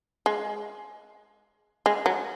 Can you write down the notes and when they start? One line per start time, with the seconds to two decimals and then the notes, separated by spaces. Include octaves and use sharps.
0.26 G#3
1.86 G#3
2.06 F#3